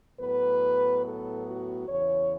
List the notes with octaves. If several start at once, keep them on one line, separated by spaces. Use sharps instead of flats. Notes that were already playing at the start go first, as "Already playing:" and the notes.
A2 F#3 B3 B4
A4
F#4
E2 C#3 E3 C#5